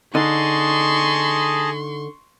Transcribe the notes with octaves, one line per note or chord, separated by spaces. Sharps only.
D3 D#4 G#4 D#5 A5 C6 C#6